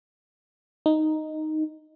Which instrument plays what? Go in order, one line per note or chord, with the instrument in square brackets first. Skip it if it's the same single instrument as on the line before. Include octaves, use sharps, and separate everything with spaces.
[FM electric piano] D#4